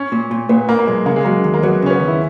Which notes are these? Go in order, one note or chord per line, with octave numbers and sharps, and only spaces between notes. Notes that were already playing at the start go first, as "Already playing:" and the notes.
Already playing: C#4
A#2
A#2
A#2 B3
A#2 A#3
A#3
B1 G#3
C#3 A#3
G#3
F#3 A#3
D#2
A#3
F#3 B3
C#3 C#4
B3
D#2
E4